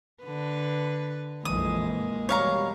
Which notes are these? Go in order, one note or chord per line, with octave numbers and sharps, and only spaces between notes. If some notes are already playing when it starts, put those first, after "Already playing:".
D3 B4
A#1 F2 E3 G#3 A#3 D#6
B2 G3 C#5 F5 A#5